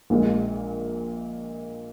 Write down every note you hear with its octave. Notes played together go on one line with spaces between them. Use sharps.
A#1 A#2 G#3